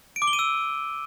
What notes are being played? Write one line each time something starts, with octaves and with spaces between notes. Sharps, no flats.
D7
D6
G7
D#7
E6